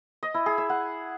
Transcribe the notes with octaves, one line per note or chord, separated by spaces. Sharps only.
D#5
E4
G#4
E5
F#5